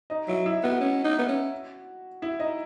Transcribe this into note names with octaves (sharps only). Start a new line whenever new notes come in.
D#4 D#5
F#3 E4 E5
E4 E5
B3 F#4 F#5
C#4
D#4
B3
C#4
E4 E5
D#4 D#5